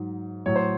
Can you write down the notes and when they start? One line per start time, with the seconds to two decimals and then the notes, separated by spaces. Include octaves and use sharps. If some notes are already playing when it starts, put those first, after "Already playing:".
Already playing: G#2 F#3
0.46 A2 F#3 C#5
0.56 C5